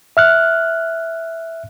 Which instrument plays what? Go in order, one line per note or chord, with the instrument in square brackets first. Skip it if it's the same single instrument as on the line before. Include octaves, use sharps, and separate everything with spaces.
[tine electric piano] E5 F6 F#6